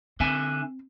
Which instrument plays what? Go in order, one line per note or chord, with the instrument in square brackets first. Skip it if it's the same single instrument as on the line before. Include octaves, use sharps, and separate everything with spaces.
[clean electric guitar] D3 E5 G#5 [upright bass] C4